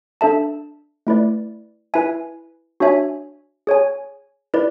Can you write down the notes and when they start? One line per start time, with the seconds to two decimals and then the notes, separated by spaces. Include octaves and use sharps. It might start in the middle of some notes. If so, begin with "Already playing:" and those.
0.21 D4 A4 E5 A5
1.07 A3 E4 B4 D5
1.94 E4 B4 E5 G#5
2.80 D4 F#4 C#5 E5 G#5
3.67 G#4 C#5 G#5
4.54 E4 B4 D5